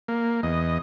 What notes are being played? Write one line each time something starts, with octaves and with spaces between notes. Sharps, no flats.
A#3
E2 D#5